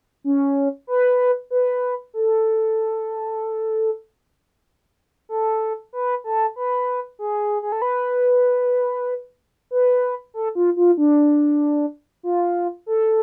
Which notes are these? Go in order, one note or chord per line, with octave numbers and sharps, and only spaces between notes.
C#4
B4
B4
A4
A4
B4
A4
B4
G#4
G#4
A4
B4
B4
A4
F4
F4
D4
F4
A4